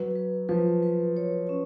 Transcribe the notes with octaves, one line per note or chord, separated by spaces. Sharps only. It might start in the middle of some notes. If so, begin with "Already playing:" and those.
Already playing: F#3 B4
B4
F3 B4
B4
C#5
C#4